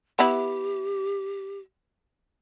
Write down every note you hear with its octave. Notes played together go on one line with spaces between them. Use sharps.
B3 E4 G4